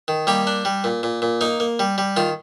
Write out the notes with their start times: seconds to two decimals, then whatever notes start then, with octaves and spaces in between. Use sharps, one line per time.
0.08 D#3
0.27 G3 A#3 G4
0.47 D4
0.65 G3
0.84 A#2
1.03 A#2
1.22 A#2
1.41 A#3 D#4
1.60 A#3
1.79 G3
1.98 G3
2.17 D#3 F4